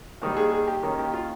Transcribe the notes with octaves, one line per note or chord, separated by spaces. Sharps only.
D#2 D#3 G3
G#4
G#4
G4
D#2 D#3 A#3 C#4
G4
F4